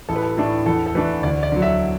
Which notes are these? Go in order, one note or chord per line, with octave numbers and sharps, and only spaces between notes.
A1 A4
B4
A4
A2 A3 D4
E2 A4
A4
E3 A3 D4 B4
D2 D5
D5
D3 F#3
E5